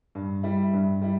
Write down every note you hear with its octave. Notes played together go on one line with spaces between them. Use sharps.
G2
G3 E4
G2
G3 E4